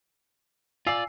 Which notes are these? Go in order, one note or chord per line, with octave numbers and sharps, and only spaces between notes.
F4 D5 G#5 E6 C7